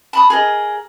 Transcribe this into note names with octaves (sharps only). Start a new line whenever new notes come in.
A5 B5 D#6
G#4 A#4 D#5